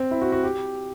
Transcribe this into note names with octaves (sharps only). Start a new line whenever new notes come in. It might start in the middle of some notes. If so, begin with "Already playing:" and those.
Already playing: C4
E4
F#4
F#4
G4